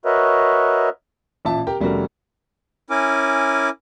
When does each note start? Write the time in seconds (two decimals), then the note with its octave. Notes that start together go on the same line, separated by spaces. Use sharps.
0.05 F#4 A#4 B4 C#5 D#5 E5
1.45 A1 A#2 E5 A5
1.67 G4 A#4 G5
1.80 F1 G3 A3 C#4 F#4 A#4
2.90 C#4 E4 A#4 G#5 D6